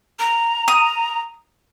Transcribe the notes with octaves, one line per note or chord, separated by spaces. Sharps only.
A#5
D#6